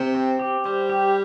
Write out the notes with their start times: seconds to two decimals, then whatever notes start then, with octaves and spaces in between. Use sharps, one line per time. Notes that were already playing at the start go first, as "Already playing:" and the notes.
Already playing: C3 C5
0.15 C4
0.39 G4
0.65 G3 C5
0.90 G4